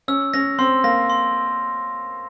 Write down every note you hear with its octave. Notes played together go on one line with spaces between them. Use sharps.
C#4 E6
C#4 A#6
C4 C6
A#3 A#6
C6